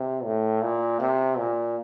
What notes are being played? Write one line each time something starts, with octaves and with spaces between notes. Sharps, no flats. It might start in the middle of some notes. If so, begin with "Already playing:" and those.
Already playing: C3
A2
A#2
C3
A#2